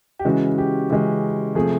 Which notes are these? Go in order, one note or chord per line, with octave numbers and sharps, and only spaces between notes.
G4
C#3 E3 G#3 C#4 F#4
G4
C#3 E3 G#3 C#4
C3 F3 A3 G#4